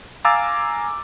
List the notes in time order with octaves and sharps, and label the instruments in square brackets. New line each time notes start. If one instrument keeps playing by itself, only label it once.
[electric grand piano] F5 G#5 A#5 D6 E6 A6